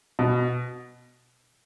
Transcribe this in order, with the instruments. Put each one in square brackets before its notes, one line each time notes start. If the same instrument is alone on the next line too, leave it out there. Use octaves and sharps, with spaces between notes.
[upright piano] B2